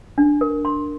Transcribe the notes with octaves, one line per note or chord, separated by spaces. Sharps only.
D4
A#4
C6